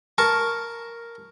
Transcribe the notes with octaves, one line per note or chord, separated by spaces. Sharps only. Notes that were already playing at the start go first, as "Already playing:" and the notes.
A#4 A5 C#6